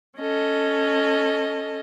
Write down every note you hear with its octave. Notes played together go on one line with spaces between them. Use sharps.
C#4 A4 D#5